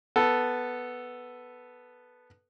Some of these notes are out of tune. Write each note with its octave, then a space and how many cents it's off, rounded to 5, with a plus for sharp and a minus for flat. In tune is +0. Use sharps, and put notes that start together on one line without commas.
B3 +0 A4 +0